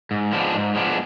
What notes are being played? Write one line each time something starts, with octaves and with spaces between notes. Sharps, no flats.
G#2
F3 G#3 B3 D4
G#2
F3 G#3 B3 D4